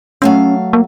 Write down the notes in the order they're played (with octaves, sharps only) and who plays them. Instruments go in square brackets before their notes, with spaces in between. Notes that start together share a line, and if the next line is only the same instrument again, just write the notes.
[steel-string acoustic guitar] F#3 A3 F5 [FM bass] C#4
[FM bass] A#3